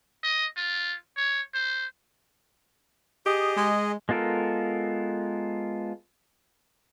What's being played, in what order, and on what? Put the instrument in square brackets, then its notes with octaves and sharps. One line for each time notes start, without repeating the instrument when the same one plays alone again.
[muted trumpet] D#5
F4
C#5
C5
[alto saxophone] G4 [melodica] G#4 D#5
[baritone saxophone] G#3
[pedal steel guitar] G#3 B3 F4 A4 A#4